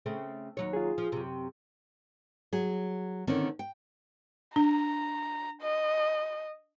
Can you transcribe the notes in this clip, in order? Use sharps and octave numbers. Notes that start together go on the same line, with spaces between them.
C#3 A3 C4
D#2 F#3 C#5
F4 G#4
F3
F#2 C3
F#3 G#4
D3 D#3 A#3 C4 C#4
G5
D4 A#5
D#5